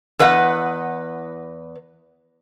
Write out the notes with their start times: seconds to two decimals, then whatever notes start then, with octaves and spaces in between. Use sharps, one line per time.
0.19 E2 B4 D#5 F#5